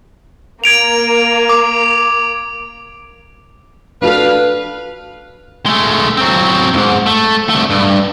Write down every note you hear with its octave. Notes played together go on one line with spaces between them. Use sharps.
A#3 G#6 D7 F7
D6
D4 F#4 A4 B4 F5
G#3 A3
F#3 C4
E2 G#2
A3
C2 A3
G2